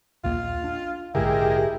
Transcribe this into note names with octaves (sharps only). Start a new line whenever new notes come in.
A#1 D#2 A#3 F4
D4
A#1 G#2 D3 G#3 E4 G4 G#4 A#4